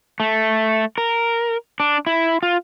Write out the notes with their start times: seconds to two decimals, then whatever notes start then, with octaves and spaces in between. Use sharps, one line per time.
0.20 A3
0.98 A#4
1.80 D4
2.07 E4
2.43 F4